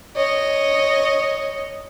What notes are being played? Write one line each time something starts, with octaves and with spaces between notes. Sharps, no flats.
C#5 D#5